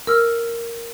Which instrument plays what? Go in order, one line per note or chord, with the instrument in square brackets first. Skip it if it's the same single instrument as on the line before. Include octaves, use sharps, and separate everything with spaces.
[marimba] A#4 E6 F6